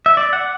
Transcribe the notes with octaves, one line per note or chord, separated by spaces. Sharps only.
E5
D5
F#5